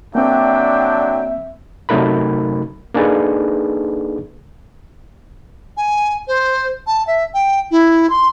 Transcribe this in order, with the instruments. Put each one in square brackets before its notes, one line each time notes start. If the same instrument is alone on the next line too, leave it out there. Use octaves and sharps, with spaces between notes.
[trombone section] D3 F#3 D4 [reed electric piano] A#3 C4 [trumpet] E5 [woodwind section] G5
[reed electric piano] C3 F#3 A3 D#4 A#4 B5
A#3 D4 D#4 G#4 A4 B4
[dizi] G#5
C5
A5
E5
G5
E4
C6